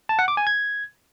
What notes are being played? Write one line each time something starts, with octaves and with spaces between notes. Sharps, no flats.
A5
F#5
D6
G#5
G#6